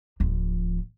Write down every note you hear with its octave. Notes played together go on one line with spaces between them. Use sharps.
D1 F3